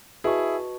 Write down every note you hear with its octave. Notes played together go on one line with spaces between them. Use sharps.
E4 F#4 G#4 B4 D#5 A5 C#6